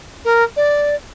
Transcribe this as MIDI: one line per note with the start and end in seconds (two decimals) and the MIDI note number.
0.25 0.44 70
0.56 0.95 74